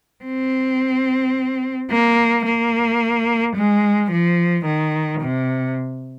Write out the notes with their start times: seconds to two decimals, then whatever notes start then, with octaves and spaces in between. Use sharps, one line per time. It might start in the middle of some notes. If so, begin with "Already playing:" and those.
0.24 C4
1.91 A#3
2.45 A#3
3.56 G#3
4.11 F3
4.65 D#3
5.21 C3